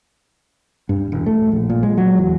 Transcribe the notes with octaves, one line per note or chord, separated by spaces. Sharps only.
G2
E1
A3
A#1
A#2
G#3
F#3
E2